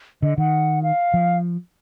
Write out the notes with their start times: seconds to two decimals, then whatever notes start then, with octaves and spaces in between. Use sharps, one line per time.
0.22 D3 D#5
0.38 D#3 F#5
0.83 F5
1.14 F3